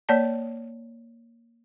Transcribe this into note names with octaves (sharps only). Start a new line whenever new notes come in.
A#3 C#5 D5 A5